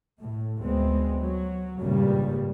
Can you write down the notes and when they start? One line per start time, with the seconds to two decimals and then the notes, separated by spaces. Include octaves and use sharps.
0.22 A2
0.61 D2 G#3 B3 C4
1.22 F#3
1.80 G#1 G2 A#2 C#3 G3